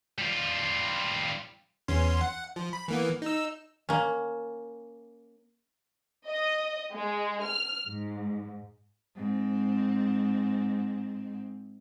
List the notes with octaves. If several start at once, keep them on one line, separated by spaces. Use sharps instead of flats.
G3 F4
E2 C#4 C6
F#5
F3
B5
E3 A#3 B3
D#4 E6
A#3 C#4
D#5
G#3
F6
G#2
G#2 C4